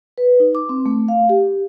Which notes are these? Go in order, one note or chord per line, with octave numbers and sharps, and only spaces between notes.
B4
D#4
D6
C4
A3
F5
G4